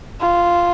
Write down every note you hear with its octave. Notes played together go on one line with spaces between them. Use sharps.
F4